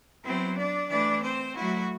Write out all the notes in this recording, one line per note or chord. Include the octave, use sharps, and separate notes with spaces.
F#3 B3 C4 E4 C5
D4 D5
E3 A3 D4 E4 D5
C4 C5
F#3 A3 E4 F#4